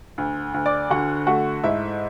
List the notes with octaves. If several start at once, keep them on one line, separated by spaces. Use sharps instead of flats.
D2
D2
D5 D6
D3 F#4 F#5
A3 F#4 F#5
G#2 E4 E5